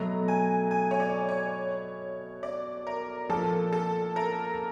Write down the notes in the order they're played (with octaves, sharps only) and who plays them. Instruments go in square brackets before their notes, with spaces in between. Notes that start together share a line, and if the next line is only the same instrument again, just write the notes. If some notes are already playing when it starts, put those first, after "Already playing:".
Already playing: [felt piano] B2 F#3 A3 [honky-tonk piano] A#5
[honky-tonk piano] G#5
G#5
C#5
D5
C#5
D5
A#4
[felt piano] A#2 F3 A#3 [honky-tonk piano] A4
[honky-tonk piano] A4
A#4